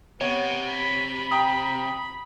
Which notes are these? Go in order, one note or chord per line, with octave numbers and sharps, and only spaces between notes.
C3 B3 C#5
B5
G5 A#5 D#6